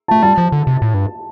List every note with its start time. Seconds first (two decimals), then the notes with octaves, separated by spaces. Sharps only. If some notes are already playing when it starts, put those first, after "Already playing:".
0.08 A3 A5
0.23 G3 A5
0.38 F3
0.52 D3
0.67 C3
0.82 A2
0.94 G2